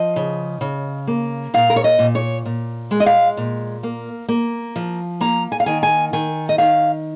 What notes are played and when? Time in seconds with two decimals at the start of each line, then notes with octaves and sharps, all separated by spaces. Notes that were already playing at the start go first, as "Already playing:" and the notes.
Already playing: F3 D#5
0.16 C#3
0.61 C#3
1.07 A#3
1.54 A#2 F5
1.70 A#4
1.76 C#5
1.84 D#5
1.99 A#2
2.15 C#5
2.45 A#2
2.91 G#3
3.00 D#5
3.06 F5
3.37 A#2
3.83 A#3
4.28 A#3
4.76 F3
5.21 A#3 A#5
5.52 G#5
5.60 F5
5.66 D#3 G#5
5.83 G#5
6.13 D#3 G#5
6.49 D#5
6.58 D#3 F5